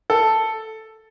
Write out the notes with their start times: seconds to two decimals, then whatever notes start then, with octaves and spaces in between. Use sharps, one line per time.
0.10 A4